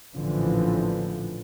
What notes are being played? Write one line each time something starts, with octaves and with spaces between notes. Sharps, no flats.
A1 A#2 D3 E3 F3